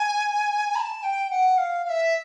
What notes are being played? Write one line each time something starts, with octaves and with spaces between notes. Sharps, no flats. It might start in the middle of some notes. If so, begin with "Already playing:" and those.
Already playing: G#5
B5
A5
G5
F#5
F5
F5
E5